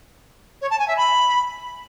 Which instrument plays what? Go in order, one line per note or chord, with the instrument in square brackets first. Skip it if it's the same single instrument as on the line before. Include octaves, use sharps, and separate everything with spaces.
[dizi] C#5
A5
G#5
E5
B5